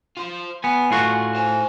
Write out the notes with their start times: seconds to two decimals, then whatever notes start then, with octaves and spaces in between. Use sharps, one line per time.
0.17 F4 C5
0.64 B3 G#5
0.91 A2 F4 F#4
1.35 C5 G#5